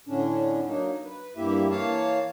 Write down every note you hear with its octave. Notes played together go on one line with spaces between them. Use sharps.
A2 D3 C#4 D4
F#3 A#3 D4 D#4
B4
G2 A#3 E4 G4 E5
E3 A#3 C#5 F5 A5